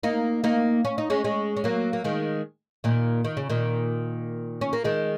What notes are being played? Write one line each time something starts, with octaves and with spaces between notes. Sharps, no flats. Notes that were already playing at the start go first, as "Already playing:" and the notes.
A#3 D#4
A#3 D#4
C#4
D#4
G#3 C#4
G#3 C#4
C#4
F#3 A#3
A#3
D#3 G#3
A#2 D#3
D#3
C#3
A#2 D#3
C#4
A#3
D#3 G#3